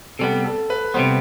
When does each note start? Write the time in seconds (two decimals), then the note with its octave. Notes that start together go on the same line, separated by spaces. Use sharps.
0.19 C3 G3 B3 A4
0.44 A4
0.70 B4
0.94 C3 G3 B3 C5